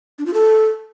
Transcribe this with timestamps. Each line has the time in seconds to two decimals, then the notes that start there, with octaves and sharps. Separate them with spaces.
0.19 D4
0.26 F4
0.34 A4